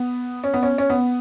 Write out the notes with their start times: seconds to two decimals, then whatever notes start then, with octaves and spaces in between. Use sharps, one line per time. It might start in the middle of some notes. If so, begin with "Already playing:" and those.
Already playing: B3
0.44 C#4
0.53 B3
0.63 C#4
0.78 C#4
0.90 B3